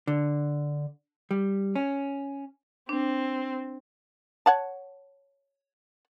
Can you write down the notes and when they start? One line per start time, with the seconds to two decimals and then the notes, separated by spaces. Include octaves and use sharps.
0.07 D3
1.31 G3
1.76 C#4
2.89 C4 D4
4.46 C#5 F#5 A5